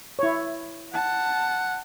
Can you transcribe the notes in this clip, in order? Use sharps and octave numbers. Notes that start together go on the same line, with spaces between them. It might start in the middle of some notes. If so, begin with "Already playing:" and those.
E4 C#5
F#5 A5